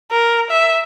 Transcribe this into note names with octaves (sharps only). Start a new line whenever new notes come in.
A#4
E5